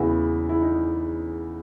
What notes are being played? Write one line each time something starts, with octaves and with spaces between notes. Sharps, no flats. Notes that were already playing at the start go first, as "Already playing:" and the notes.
Already playing: E2 C#3 E3 E4 F#4
E4
D#4